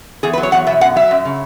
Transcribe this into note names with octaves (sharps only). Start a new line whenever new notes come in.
E2 G#4
B4
F#3
C#5
E2 F#5
B2 E5
F#2 F#5
F#3 E5
F#2
C#3